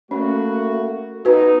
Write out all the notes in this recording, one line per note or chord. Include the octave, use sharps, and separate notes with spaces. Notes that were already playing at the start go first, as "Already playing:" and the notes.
A3 A#3 C#4 F#4
B3 D#4 F#4 B4